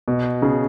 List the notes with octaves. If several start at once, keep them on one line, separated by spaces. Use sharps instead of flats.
B2
C#3